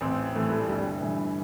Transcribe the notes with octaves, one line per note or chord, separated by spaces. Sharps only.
A1 C4
A2 E3 A3
G3
G1 G3
G2 E3